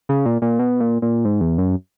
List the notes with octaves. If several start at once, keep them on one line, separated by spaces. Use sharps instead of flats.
C#3
A#2
A#2
B2
A#2
A#2
G#2
E2
F#2